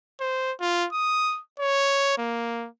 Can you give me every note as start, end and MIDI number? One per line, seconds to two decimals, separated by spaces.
0.21 0.52 72
0.61 0.87 65
0.93 1.40 87
1.60 2.16 73
2.18 2.67 58